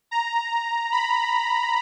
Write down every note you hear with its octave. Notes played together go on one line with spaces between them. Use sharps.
A#5
B5